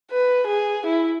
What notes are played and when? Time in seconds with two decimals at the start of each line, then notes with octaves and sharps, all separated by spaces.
0.11 B4
0.47 G#4
0.86 E4